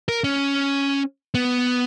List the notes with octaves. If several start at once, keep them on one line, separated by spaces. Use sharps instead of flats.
A#4
C#4
B3